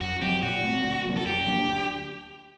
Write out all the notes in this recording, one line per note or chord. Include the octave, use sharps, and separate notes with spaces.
F#2 F#4
F#3 C4 G4
A#2 F#4
A3 C4
D2
C3 F#3 A#3
A4
F#2 G4
F#3 A#3 D4
D2